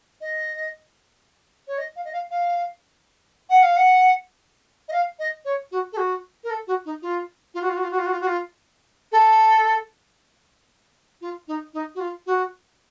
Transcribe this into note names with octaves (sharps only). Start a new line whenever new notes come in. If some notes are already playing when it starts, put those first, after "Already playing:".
D#5
C#5
D#5
F5
D#5
F5
F5
F#5
F5
F#5
D#5
F5
D#5
C#5
F#4
A4
F#4
A#4
A4
F#4
D#4
F4
F4
F#4
F4
F#4
F4
F#4
F4
F#4
F4
F#4
F4
A4
F4
D#4
D#4
F#4
F4
F#4